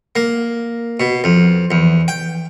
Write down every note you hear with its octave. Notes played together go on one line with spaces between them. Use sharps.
A#3
B2
F2
E2
G5